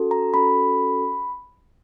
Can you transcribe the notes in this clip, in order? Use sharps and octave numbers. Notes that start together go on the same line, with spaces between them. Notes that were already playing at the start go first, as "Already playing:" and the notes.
Already playing: C#4 F#4 A4
A#5
C#4 F#4 A4 B5